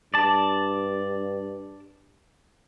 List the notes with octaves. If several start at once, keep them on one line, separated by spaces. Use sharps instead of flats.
G2 D5 A5